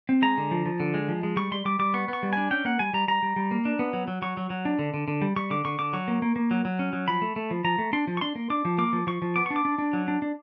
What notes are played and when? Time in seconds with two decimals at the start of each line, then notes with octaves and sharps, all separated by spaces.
0.09 C4
0.22 G#3 A#5
0.37 D3
0.51 F3
0.66 F3
0.80 D3
0.94 G#3
1.09 F3
1.23 G#3
1.37 G3 C#6
1.52 G3 C6
1.65 G3 D6
1.79 G3 D6
1.94 B3 C#6
2.08 B3 C#6
2.23 G3
2.33 D4 G#5
2.51 C#4 G5
2.65 A#3 F#5
2.79 G3 G#5
2.93 G3 A#5
3.08 G3 A#5
3.22 G3
3.36 G3
3.51 A#3
3.65 D4
3.79 B3
3.93 F#3
4.08 F#3
4.22 F#3 C#6
4.37 F#3
4.50 F#3
4.65 D4
4.79 D3
4.94 D3
5.08 D3
5.22 G3
5.36 G3 C#6
5.50 D3 D6
5.65 D3 C#6
5.79 D3 D6
5.93 F#3 C#6
6.08 A#3
6.22 A#3
6.36 A#3
6.51 F#3
6.65 F#3
6.79 C#4
6.93 F#3
7.08 F3 B5
7.22 A3
7.36 A3
7.51 F3
7.64 F3 A#5
7.78 A3
7.93 D4 C6
8.07 F3
8.17 C#6
8.21 D4 C6
8.35 A#3
8.50 D4 D6
8.65 F3
8.78 A#3 D6
8.93 F3
9.07 F3 C#6
9.22 F3
9.36 B3 D6
9.46 D4 C#6
9.56 D6
9.65 D4
9.78 D4
9.93 F#3
10.08 D4
10.22 D4